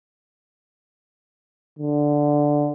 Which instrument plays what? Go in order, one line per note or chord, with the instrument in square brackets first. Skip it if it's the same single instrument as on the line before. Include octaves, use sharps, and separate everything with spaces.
[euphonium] D3